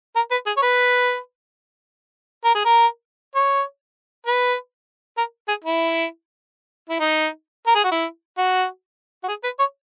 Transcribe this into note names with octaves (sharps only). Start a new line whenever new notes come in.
A#4
B4
G#4
C#5
B4
A#4
G#4
A#4
C#5
B4
A#4
G#4
E4
E4
D#4
A#4
G#4
F#4
E4
F#4
F#4
G#4
B4
C#5